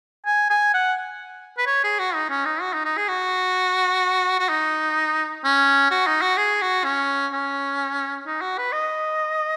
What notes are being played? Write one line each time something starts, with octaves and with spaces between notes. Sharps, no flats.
G#5
G#5
F#5
B4
C#5
G#4
F#4
D#4
C#4
D#4
F#4
D#4
D#4
G#4
F#4
F#4
D#4
C#4
F#4
D#4
F#4
G#4
F#4
C#4
C#4
D#4
F#4
B4
D#5